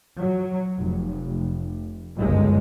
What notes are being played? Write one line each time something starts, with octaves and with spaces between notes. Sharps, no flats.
F#3
F1
G1 C#2 F#2 G#3